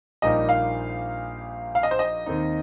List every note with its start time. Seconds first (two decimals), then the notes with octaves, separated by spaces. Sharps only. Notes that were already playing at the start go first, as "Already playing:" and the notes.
0.22 A#1 A#2 G3 A#3 D#4 D#5
0.49 F5
1.75 F5
1.83 D#5
1.91 C5
1.99 D#5
2.26 D#2 D#3 C4 D#4